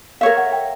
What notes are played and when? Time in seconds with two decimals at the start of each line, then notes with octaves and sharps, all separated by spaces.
0.21 A#4 C#5 E5 F5
0.37 F#5
0.53 G5